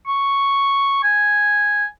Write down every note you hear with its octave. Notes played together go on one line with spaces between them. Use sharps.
C#6
G#5